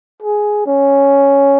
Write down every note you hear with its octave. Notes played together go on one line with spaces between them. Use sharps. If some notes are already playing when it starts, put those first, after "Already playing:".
G#4
C#4